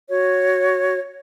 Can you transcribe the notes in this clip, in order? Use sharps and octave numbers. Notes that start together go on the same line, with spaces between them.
F#4 C#5